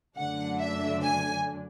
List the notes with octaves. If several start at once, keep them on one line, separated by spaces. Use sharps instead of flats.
F#2 D3 F#3 A3 D4 F#5
E5
G#5